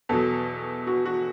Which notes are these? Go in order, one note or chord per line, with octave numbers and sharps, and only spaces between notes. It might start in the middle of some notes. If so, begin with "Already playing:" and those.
E2 B2 F#3 A4
F#4
F#4